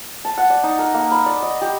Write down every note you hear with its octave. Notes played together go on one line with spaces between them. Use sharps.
A5
F#5
D5
D#4
A#4
A#3
B5
D5
D#5
G4